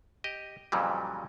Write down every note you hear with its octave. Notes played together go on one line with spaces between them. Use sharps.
G4 D#5
F2 A#2 C#3 E3 F#3 G3